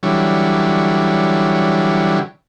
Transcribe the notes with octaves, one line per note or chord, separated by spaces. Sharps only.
D3 E3 F#3 G3 C#4